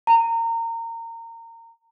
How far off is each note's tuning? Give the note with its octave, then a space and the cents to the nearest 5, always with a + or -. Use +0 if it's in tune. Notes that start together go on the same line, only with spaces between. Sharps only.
A#5 -25